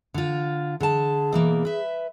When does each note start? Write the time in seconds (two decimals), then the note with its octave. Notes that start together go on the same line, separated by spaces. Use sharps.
0.14 D3 F4
0.81 D3 G#4 A5
1.33 B2 E3 A#3
1.65 B4 E5